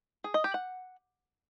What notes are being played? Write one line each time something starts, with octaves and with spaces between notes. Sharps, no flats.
G#4
D#5
G4
F#5